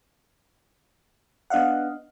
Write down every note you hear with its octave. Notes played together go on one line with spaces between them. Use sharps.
B3 D4 D#5 F5 F#5